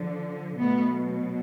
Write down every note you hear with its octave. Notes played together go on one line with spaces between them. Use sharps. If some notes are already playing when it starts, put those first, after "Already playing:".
Already playing: D3 F3
B2 F#3 A3 B3